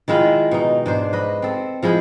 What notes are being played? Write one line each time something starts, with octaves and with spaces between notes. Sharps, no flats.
D#3 G#3 E4 F4
B2 D#4
G#2 D4 C5
B4 D#5
C4 A4
F3 G#3 E4 G#4